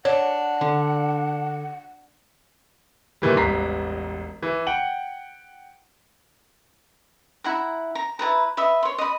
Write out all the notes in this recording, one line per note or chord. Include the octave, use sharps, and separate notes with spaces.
D4 C#5 F#5
D3
A#2 D#3 E3 G3
E1 A1 G3 A#5 B6 C7
E3
F#5 G5 F#7
E4 F#5 A#5
A#5
E4 A4 B4 A#5
B4 D#5 E5
C#5 C6
D#5 B5